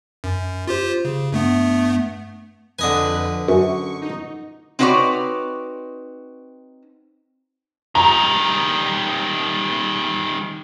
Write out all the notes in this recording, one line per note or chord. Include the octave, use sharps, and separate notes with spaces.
F#2
F4 G4 C5
C#3
G2 A3 B3
F2 D3 B4 D#5 G#5
F#2 C#6
D#4
C4 D#4 F#4 B4 C#5 D5
D#3 G3 A#5